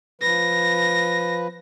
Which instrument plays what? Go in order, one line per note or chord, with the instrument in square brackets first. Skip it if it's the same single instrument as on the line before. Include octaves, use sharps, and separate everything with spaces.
[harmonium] F3 B4 [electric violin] A#6